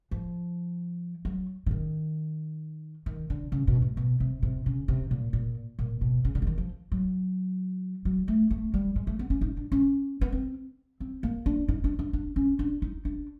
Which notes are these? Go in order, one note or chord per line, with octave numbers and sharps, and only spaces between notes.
F3
F#3
D3
D#3
D#3
D3
C#3
B2
A2
B2
C3
C3
C#3
C3
A#2
A#2
A#2
B2
C#3
D3
E3
D#3
F3
F#3
F#3
A3
A3
G3
G#3
A3
B3
C#4
D#4
D4
C#4
B3
C4
C4
A#3
D4
D#4
D4
D4
D4
C#4
D4
D#4
D4